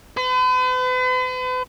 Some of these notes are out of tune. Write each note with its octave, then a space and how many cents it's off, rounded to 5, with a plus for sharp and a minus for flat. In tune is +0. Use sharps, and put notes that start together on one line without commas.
B4 +45